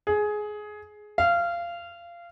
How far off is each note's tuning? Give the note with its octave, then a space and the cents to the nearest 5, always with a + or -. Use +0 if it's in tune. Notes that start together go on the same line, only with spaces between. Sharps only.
G#4 +15
F5 -20